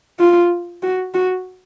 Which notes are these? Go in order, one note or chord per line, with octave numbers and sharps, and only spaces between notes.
F4
F#4
F#4